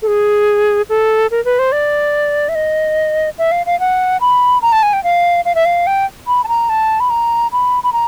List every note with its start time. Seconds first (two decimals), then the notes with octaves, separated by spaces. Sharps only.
0.02 A4
0.07 G#4
0.89 A4
1.31 A#4
1.45 B4
1.59 C5
1.72 D5
2.49 E5
2.55 D#5
3.38 E5
3.52 F5
3.66 F5
3.80 F#5
4.21 B5
4.62 A#5
4.72 A5
4.83 G#5
4.93 G5
5.04 F5
5.45 F5
5.55 E5
5.65 F5
5.87 G5
6.27 B5
6.44 A5
6.48 A#5
6.69 A5
7.00 B5
7.10 A#5
7.52 B5
7.84 B5
7.93 A#5